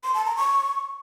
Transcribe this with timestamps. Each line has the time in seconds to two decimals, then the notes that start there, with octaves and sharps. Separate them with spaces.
0.04 C6
0.14 A5
0.25 A#5
0.36 C#6